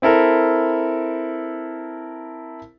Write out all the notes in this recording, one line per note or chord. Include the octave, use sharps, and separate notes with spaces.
C4 E4 A4 A#4